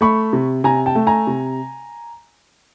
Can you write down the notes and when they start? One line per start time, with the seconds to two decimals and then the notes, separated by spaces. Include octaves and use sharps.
0.01 A3 B5 C#6
0.33 C3
0.64 C3 G#5 A#5
0.86 G5 A5
0.95 A3
1.07 G#5 A#5
1.27 C3